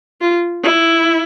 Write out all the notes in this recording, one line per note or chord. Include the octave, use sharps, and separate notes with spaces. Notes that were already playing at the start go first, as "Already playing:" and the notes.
F4
E4